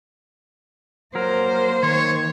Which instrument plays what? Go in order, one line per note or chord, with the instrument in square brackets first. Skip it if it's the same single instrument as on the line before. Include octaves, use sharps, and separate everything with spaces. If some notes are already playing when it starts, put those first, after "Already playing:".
[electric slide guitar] F#3 A#4 [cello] A#3 C5
[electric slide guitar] D#3 [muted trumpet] C#5